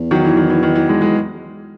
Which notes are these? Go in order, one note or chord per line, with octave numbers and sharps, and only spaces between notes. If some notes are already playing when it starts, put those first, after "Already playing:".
Already playing: E2
D#3 F#3
E3
D#3
E3
D#3
E3
E3 G#3
E3 G#3